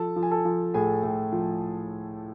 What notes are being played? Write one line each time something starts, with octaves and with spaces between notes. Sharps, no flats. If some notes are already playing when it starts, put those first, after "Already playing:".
Already playing: F3 A4 A5
F3
G#5
A4 A5
F3
A2 G#4 G#5
A2
F3